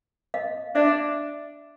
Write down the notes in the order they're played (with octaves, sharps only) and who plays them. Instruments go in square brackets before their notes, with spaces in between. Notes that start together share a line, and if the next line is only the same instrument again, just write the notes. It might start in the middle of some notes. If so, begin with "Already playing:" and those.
[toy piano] D#5 F5
[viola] D4 [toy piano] D5 E5